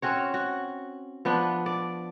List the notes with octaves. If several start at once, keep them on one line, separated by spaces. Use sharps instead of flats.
C4 C#4 F#4 C#5
F#4
F3 B3 D4
D5